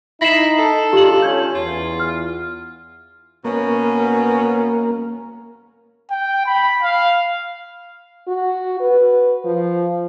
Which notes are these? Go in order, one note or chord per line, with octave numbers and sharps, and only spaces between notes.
D#4 E4 A#6 C7 E7
A4
G#3 D4 F4 G4 F#7
C#4 G6 G#6
E2 F4
F6
B2 A#3 B3 C#4
G5
B5
F5
F#4
B4
F3